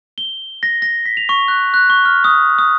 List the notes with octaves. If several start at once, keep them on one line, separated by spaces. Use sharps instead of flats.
G7
A#6
A#6
B6
F7
C#6
F#6
F#6
C#6
F6
D#6
D#6